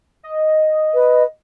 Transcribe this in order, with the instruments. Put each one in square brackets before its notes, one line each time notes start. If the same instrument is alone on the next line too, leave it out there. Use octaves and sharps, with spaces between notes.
[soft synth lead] D#5
[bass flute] B4